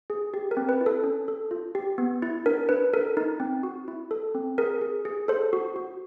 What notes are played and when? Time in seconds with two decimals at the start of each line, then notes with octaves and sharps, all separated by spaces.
0.10 G#4
0.34 G4
0.51 A#4
0.57 C4
0.69 B4
0.81 E4
0.86 A4
1.04 C#4
1.28 A4
1.51 F4
1.75 G4
1.98 B3
2.22 E4
2.46 D4 A#4
2.69 D4 B4
2.94 A4 A#4
3.17 D#4
3.40 C4
3.63 F#4
3.88 E4
4.11 A4
4.35 C4
4.58 G#4 A#4
4.81 G#4
5.05 G#4
5.28 A4 C5
5.53 F#4
5.76 F#4